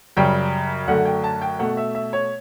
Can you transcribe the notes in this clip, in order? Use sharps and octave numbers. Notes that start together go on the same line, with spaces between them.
F#2 C#3 G3 G5
F#2 D3 A3 F#5
G5
A5
G5
B2 A3 F#5
E5
E5
C#5